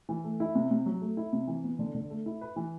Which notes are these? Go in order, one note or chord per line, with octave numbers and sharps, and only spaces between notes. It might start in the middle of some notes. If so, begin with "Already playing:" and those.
E3
A3
E4
C3
C3
F#3
A3
E4
C3
E3
B3
D3
D3
A3
E4
B4
E3